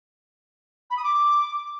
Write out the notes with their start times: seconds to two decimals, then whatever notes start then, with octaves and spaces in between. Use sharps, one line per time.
0.90 B5
0.97 D#6
1.04 D6